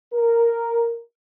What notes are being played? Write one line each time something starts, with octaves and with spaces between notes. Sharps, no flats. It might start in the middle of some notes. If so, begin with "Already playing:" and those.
A#4